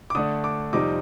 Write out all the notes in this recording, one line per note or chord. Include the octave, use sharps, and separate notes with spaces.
D6
D3 A3 D4 D#6
D6
F2 C3 G3 C4 D#4 D6